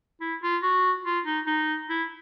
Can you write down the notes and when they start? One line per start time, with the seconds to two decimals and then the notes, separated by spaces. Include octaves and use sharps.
0.20 E4
0.42 F4
0.62 F#4
1.05 F4
1.25 D#4
1.47 D#4
1.89 E4